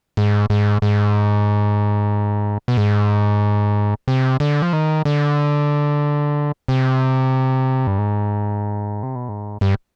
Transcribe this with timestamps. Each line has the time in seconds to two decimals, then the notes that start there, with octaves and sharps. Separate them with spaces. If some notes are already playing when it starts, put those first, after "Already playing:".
0.17 G#2
0.50 G#2
0.82 G#2
2.68 B2
2.77 G#2
4.08 C3
4.40 D3
4.62 F3
4.73 D#3
5.05 D3
6.68 C3
7.87 G2
7.98 G#2
9.03 C3
9.15 B2
9.29 G#2
9.61 G2